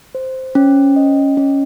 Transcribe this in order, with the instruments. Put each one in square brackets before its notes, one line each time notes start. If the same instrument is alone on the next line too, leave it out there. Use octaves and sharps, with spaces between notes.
[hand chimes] C5
C#4
D#5
C#4